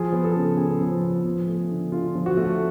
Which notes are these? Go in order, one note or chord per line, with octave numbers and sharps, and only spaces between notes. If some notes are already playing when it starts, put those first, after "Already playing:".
Already playing: F3 G#4
B3
A4
C#3
C#3 G#4
F3
B3
F3
A3
D3
D3 F4
F3
F#4
A3